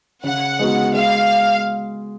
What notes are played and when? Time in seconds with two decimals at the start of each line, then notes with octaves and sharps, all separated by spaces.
0.23 C#3 F#5
0.59 G#3 B3 D#4 F#4
0.94 G#3 F5